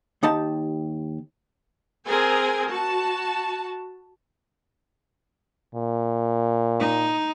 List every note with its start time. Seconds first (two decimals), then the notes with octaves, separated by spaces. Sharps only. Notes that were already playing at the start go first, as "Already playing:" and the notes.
0.23 D#2 D#4 G4 A5
2.08 C4 G#4 A#4 G#5
2.69 F#4 A5
5.75 A#2
6.80 D#4